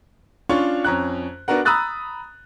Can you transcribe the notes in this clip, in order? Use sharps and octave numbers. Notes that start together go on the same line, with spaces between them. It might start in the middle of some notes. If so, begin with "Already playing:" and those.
C#4 D4 F4 C#5 C#6
F2 C#4 A#5 F#6
B3 D4 F#4 A#4 F#5
A#5 B5 D#6 E6 F#6 A6